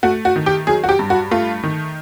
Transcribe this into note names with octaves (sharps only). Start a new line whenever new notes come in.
A3 F#4
F#4
D#3
G4
F#3 G#4
F#4
G4
G2
F#4
A3 F4
D#3